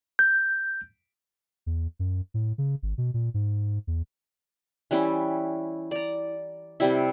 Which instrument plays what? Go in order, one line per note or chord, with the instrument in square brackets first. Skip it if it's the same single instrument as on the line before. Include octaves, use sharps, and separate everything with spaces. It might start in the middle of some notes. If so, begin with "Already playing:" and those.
[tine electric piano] G6
[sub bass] E2
F#2
A2
C#3
G#1
B2
A#2
G#2
E2
[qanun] E3 G3 C#4 E4
D5 A#5
C3 G3 E4